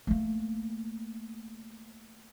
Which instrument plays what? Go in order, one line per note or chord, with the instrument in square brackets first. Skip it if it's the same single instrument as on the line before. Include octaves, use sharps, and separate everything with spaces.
[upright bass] A3 A#3